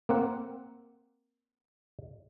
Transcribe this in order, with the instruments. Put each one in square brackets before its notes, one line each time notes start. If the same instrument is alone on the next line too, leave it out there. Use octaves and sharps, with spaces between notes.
[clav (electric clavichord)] A#3 C4 F#5